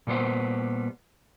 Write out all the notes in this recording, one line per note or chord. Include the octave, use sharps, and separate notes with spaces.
A#2 G3 B3 C5